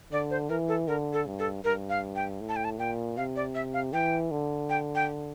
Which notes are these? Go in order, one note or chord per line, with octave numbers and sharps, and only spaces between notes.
D3 D5
C5
E3 A#4
A4
D3 A#4
A4
G2
A4
G2 A#4
F5
G5
A2
A5
G5
A5
A#2 G5
C3 F5
D5
E5
F5
E3 G5
D3
G5
G5